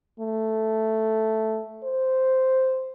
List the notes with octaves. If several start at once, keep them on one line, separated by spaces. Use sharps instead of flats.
A3
C5